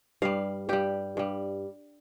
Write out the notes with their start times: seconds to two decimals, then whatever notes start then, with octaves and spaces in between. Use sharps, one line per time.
0.22 G2 G3 F5
0.69 G2 G3 G4
1.17 G2 G3